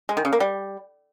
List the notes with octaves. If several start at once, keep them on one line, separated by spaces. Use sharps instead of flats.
G#3
D#3
C#3
A#3
G3